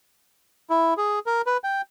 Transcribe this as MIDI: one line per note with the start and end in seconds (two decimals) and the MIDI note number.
0.70 0.94 64
0.97 1.19 68
1.26 1.42 70
1.47 1.57 71
1.64 1.82 79